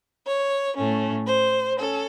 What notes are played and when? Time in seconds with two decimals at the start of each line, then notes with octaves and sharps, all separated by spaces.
0.26 C#5
0.76 A2 A3 C#4
1.26 C5
1.78 C#4 A4